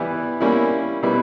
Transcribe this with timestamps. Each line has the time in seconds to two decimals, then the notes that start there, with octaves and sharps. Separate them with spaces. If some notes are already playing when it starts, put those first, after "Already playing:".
Already playing: E3 G3 B3 E4
0.41 G3 A#3 C#4 E4
1.03 B2 G3 B3 E4